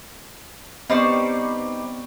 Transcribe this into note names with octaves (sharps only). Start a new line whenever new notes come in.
G3 B3 C4 D#4 G4 C5 D5 C#6